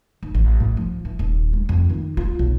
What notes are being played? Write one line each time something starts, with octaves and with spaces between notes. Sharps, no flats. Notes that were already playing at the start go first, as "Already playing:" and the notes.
D#2
A1
A2
F3
E3
D#1
G#3
F2
D#3
F4
B1